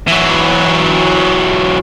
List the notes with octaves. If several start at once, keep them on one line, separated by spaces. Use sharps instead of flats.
E3 F#3